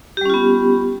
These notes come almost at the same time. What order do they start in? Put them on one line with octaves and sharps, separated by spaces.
G4 G3 C#4 F4 B3